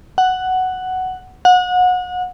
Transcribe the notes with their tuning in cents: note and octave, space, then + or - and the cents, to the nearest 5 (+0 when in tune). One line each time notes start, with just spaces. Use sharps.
F#5 +5
F#5 -30